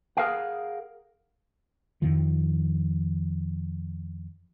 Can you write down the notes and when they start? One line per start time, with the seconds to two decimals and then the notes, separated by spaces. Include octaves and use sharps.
0.17 G#4 A#4 F5 F#5
2.02 F2 D#3 F3